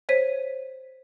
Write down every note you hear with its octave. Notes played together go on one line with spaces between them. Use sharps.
C5 C#5 B6 D#7